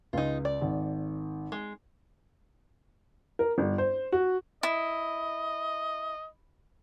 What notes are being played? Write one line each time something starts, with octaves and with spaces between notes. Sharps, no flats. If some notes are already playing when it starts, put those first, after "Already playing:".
C#2 D#4 F4
D5
G#1
G#3
A#4
G1
C5
F#4
E4 D#5